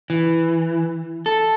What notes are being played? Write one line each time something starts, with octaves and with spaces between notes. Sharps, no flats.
E3
A4